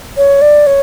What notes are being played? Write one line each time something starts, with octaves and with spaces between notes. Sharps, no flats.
C#5
D5
C#5